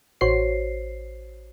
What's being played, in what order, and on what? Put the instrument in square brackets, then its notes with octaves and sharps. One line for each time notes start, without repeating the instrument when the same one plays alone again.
[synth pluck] A1 F#4 C5 C#5 C7